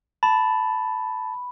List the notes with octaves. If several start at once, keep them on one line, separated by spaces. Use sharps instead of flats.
A5 B5